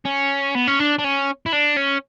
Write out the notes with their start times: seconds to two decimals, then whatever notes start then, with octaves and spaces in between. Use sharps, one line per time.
0.05 C#4
0.55 B3
0.67 C#4
0.79 D4
0.98 D4
1.04 C#4
1.46 E4
1.53 D4
1.77 C#4